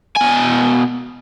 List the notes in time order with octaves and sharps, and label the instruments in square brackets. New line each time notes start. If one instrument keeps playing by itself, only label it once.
[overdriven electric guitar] B2 G#5